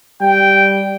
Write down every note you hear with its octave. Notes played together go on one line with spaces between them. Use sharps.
G3 G5